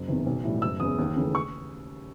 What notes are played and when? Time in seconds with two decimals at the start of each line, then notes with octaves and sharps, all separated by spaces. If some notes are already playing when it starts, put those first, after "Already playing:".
Already playing: F#1
0.08 E2 C3 D#3
0.26 B1
0.44 A2 E3 G3
0.62 F#1 E6
0.80 E2 C#3 D#6
0.98 D#2
1.16 C#3 E3 A3
1.35 C#6